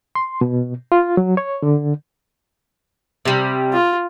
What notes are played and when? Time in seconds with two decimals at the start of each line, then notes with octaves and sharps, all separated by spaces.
0.15 C6
0.41 B2
0.92 F4
1.17 F#3
1.37 C#5
1.63 D3
3.25 C3 G3
3.73 F4